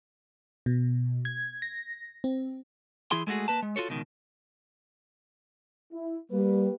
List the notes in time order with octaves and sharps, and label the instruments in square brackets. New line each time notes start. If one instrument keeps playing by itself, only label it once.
[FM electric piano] B2
G#6
A#6
C4
[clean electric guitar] E3 E4 G#4 C6
G#3 A3 F4 F#4 G#4
A#3 B4 A5
G#3
F4 F#4 A4 C#5
C#2 B2 D#3
[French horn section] E4
[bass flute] G3 [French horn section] A#3 G4 B4